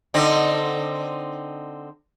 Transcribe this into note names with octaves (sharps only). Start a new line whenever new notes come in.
D3 C4 D#4